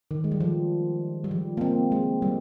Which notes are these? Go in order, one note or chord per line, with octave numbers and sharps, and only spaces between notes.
D#3
G#3
G3
F3
G3
F3
A#3
C4
G#3
G3